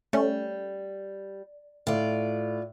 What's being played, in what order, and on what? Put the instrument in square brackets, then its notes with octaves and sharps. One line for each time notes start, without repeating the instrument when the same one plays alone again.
[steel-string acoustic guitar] G3 [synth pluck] A3 C#4
[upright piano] A2 [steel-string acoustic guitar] F4 D5